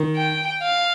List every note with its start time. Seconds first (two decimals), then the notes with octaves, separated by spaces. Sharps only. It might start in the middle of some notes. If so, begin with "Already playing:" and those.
Already playing: D#3
0.17 G5
0.63 F5